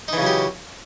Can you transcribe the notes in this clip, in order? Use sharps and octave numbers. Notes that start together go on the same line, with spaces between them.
C#3 E3 F#3 D#4 G4